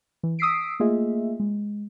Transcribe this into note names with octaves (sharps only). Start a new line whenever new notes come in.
E3
D#6 E6 B6 C7 D7
A3 A#3 F4 G#4 D#5 E5
G#3